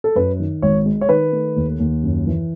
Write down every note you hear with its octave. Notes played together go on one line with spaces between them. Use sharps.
A4
F#2 B4
D#3
G#1 C#5
G#3
C#5
D#3 B4
A3
D#2
D#2
F#2
E3